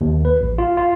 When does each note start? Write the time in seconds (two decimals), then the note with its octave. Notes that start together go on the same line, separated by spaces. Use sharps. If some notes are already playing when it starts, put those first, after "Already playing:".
0.01 D#2
0.25 B4
0.41 A1
0.58 F4
0.77 F4